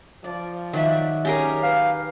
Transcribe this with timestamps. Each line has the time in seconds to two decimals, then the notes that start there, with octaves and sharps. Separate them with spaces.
0.24 F3 D5
0.73 D#3 F#3 D5 E5
1.25 C#4 G4 G#4 A#4
1.63 B4 F5